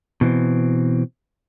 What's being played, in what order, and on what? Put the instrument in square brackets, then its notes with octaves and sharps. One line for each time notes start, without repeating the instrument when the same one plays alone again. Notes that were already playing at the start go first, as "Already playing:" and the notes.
[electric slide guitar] B2 E3 C4